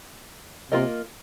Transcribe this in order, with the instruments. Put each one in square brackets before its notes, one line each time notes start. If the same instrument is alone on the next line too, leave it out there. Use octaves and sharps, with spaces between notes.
[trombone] C3 [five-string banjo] A#3 F4 A#4 D#5